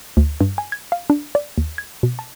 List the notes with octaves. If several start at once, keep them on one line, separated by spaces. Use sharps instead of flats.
D2
G2
G#5
G#6
F5
D4
D5
D#2
G#6
B2
A5